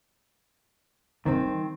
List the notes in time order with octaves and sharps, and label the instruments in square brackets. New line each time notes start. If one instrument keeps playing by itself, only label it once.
[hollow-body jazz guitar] D#3 C4 [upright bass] E3 G3